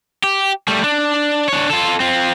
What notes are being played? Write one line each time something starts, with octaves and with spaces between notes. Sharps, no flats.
G4
G3 A3
D4
D4 C#5
F4 A4
C4 F4